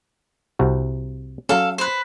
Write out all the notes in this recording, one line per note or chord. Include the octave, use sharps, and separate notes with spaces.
C2 C3 F#4
F#3 C#4 A4 F5
B4 C5